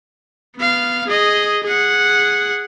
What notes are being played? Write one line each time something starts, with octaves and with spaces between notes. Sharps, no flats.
B3 F5
G#4 D#5
G#4 F#5